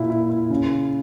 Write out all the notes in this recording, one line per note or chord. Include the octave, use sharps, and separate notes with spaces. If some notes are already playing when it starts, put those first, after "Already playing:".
Already playing: A#2 E4
E4
E4
C#3